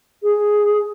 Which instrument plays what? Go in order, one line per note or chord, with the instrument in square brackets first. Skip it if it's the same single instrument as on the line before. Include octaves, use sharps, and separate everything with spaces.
[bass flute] G#4